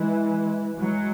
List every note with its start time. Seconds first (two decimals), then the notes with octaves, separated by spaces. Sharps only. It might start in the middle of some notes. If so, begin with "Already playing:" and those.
Already playing: E3 G#3
0.78 F#3 G#3